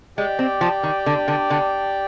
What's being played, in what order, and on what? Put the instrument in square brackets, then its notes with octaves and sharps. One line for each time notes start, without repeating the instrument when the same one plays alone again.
[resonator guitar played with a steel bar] G#3 [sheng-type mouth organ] G4 D5 G5
[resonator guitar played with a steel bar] C4
F3
D#3
D3
D3
D3